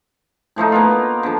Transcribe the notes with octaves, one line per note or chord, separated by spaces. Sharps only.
A2 F3 A3 D#4
A#3 B3 F4
D3 F3